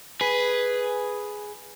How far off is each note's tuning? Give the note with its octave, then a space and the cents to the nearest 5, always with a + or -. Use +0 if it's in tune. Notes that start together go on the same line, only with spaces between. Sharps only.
G#4 +0 B4 +0